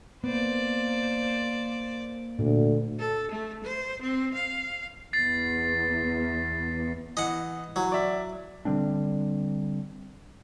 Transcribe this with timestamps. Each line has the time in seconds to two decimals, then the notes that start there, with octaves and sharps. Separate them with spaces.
0.24 A#3 B3 C5 D5
2.39 D2 A#2
2.99 A4
3.31 A3
3.64 C5
4.02 C4
4.34 F5
5.13 E2 A6 C7
7.17 E3 D#5 F#5
7.76 E3 F#3
7.92 D5 E5
8.65 D3 G3 C4 D4